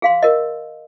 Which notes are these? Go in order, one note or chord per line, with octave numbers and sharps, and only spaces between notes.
G#4 F5 C6
A#4 D#5